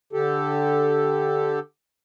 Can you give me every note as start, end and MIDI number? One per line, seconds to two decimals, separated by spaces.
0.13 1.59 50
0.13 1.59 67
0.13 1.59 69